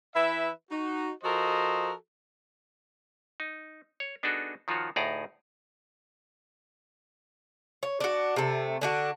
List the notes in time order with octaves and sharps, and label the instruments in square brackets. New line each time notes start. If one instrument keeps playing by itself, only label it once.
[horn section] E3 E4 B4 E5
D#4 F#4
F3 F#4 A4 A#4 C5 D#5
[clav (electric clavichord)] D#4
C#5
B3 D4 D#4 F#4 G#4 A4
D#3 F3 F4 F#4 C#5
D2 A2 D#4 G#4 D5 A#5
[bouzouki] C#5
D4 F#4
C3 A3
D3 D4 F#4